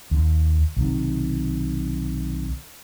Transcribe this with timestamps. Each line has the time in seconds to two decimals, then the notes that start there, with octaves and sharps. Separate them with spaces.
0.11 D#2
0.77 B1 C3 D#3